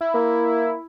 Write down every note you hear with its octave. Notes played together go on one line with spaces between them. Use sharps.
E4
A#3